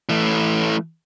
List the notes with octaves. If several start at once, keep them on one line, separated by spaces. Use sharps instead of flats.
E3 A3